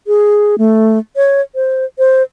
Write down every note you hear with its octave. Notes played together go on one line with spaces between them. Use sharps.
G#4
A3
C#5
C5
C5